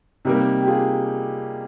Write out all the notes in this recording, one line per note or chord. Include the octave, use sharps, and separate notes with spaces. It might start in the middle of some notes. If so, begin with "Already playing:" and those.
C3 G3 A#3 D#4 G4
G4
F4 G#4